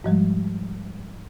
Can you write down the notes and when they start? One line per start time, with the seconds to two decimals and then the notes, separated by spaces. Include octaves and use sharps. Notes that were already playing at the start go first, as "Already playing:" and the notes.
0.04 G#2 F3 G3 G#3